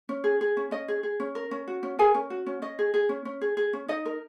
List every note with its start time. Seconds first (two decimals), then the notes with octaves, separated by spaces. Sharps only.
0.09 C#4
0.24 G#4
0.41 G#4
0.57 C#4
0.71 C#4 D#5
0.88 G#4
1.03 G#4
1.20 C#4
1.35 A#4
1.51 C#4
1.68 F#4
1.83 C#4
1.99 G#4 A#4 G#5
2.15 C#4
2.30 F#4
2.46 C#4
2.62 C#4 D#5
2.79 G#4
2.94 G#4
3.09 C#4
3.25 C#4
3.41 G#4
3.57 G#4
3.73 C#4
3.88 D#4 D#5
4.06 A#4